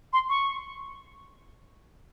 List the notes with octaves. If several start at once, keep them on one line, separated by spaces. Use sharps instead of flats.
C6
C#6